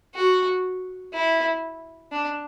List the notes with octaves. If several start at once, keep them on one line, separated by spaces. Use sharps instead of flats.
F#4
E4
D4